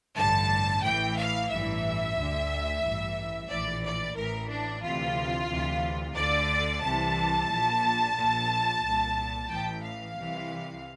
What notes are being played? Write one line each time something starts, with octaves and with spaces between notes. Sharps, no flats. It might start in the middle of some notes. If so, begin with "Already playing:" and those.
A1 G2 D3 A5
A1 A2 E3 G5
F5
A1 G2 E3 E5
D2 D3
A1 G2 E3
A#1 A2 E3 D5
D5
A1 A2 E3 A#4
D4
D2 C3 E3 F4
D2 C3 E3
D2 D3 D5
C2 C3 E3 A5
A#1 A#2
A#1 A#2
C2 A#2
A1 A2 E3 G5
F5
C2 C3 E3